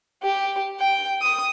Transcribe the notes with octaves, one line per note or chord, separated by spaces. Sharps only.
G4
G5
D#6